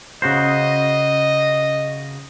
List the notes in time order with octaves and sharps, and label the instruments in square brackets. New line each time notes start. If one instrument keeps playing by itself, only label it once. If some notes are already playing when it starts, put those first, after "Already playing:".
[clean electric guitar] C#3 F#4 C5 [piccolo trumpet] D#5